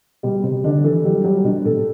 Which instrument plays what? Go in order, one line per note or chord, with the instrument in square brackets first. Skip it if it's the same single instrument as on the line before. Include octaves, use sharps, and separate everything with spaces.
[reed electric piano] B2 [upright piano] G3
[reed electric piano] C3 [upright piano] G3
[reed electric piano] D3 [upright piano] D4
[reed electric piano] E3 [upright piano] A4
[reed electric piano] F#3 [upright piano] G3
[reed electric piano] F#3 [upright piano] G3
[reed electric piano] B2 [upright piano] D4
[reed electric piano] A2 [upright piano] A4